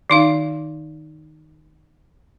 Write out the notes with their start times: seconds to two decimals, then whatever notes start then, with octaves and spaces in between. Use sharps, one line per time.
0.10 D#3 D#4 F5